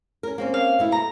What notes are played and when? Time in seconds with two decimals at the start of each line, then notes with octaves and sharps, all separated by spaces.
0.23 C#4 A#4
0.38 A#3 C4 C#4
0.54 F5
0.79 B2 A3 E4
0.92 A#5